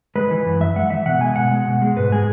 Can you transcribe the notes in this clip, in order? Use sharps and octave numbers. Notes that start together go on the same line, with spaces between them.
G#3 B4
E3
F#2
F#2 E5
G#3 F#5
E3 E5
B2 F#5
G#3 G#5
B2 F#5
G#3
B2
G#3
G#2 B4
G#3 G#4